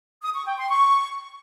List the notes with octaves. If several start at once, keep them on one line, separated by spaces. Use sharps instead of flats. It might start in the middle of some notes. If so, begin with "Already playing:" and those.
D#6
C#6
G5
C6
C#6